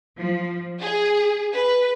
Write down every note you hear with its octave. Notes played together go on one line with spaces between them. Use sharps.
F3
G#4
B4